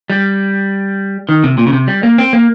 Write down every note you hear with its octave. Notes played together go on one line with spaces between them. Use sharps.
G3
D#3
C3
A#2
C#3
C3
G3
A#3
C4
A#3